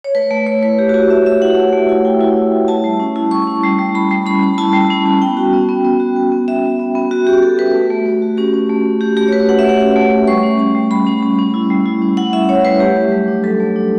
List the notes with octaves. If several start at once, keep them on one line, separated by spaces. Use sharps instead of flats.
C#5
A3 B4
A3
A3 C#5
E4 B4
A3 G4
F#4
E4 G4
A3 E5
A3 E5
E4 F#5
A3
A3
E4
E4 G5
E4
A3
E4
E4 A5
G3
C#4
E4
G3 C#6
C#4
G3
G3
G3 B5
G3
C#4 B5
C#4
E4 A5
G3
C#4
C#4
B3 G5
F#4
B3
B3
B3
F#4
B3
B3
F#4 E5
B3
B3
B3
B3 F#4
B3 G4
F#4 A4
F#4 B4
A3
A3
A3
F#4
C#4 G4
C#4
A3
C#4
C#4 G4
A3 G4
C#5
F#4 B4
A3 F#5
E5
A3 F#5
C#4
A3
A3
G3 C#6
C#4
C#4
G3
G3 B5
C#4
C#4
C#4
E4
G3
E4
C#4
E4 F#5
E4 E5
C#4 C#5
G3 B4
A3 G4
F#3
F#3
D4
F#3 A4
A3
D4